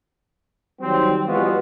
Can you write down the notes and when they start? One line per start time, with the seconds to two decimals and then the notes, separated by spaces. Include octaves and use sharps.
0.80 D#3 F#3 G3 C4
1.25 E3 G3 G#3 B3 F4 F#4